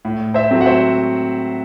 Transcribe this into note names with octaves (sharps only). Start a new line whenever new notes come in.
A2
C5 E5
F#3 A3 C4
F#5
C5 E5